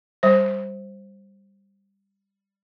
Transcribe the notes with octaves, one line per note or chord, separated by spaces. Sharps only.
G3 C5